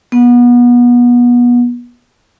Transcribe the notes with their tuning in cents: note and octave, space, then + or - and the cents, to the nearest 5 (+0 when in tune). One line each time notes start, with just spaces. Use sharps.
B3 -30